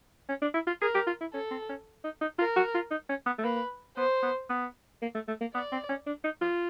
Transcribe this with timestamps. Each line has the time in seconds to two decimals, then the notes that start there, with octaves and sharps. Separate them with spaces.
0.29 C#4
0.42 D4
0.54 E4
0.67 F4
0.81 G#4 A#4
0.95 G4
1.07 F4
1.21 E4
1.34 C#4 A4
1.51 C4
1.69 C#4
2.04 D#4
2.21 D#4
2.39 F4 A#4
2.57 F#4
2.75 F4
2.91 D#4
3.09 C#4
3.26 B3
3.38 A3
3.44 A#3 B4
3.97 B3 C5
4.23 B3
4.50 B3
5.02 A#3
5.15 A3
5.28 A3
5.41 A#3
5.54 B3 D5
5.72 C4
5.89 C#4
6.07 D4
6.24 D#4
6.42 F4